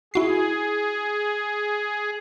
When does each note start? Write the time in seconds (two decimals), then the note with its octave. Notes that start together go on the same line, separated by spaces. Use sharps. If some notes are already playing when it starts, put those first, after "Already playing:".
0.14 E4 F#4 G#4 C7